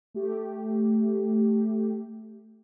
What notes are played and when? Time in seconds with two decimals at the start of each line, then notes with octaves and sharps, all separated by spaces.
0.14 A3 G4